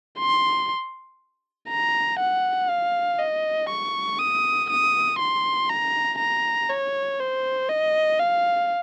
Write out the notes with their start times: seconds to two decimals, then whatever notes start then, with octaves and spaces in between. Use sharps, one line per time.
0.19 C6
1.69 A#5
2.19 F#5
2.70 F5
3.19 D#5
3.70 C#6
4.19 D#6
4.70 D#6
5.19 C6
5.69 A#5
6.19 A#5
6.70 C#5
7.20 C5
7.69 D#5
8.19 F5